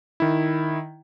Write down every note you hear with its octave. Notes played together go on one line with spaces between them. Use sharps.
D#3 E4